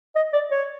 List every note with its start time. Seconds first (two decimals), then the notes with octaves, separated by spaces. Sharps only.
0.15 D#5
0.33 D5
0.51 C#5